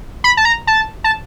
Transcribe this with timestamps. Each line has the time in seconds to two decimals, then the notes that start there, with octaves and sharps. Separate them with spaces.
0.24 B5
0.37 A5
0.45 A#5
0.67 A5
1.04 A5